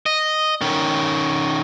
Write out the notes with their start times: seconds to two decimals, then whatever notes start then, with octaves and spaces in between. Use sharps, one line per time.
0.06 D#5
0.61 D#3 C#4